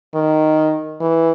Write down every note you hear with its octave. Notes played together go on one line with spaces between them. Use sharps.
D#3
E3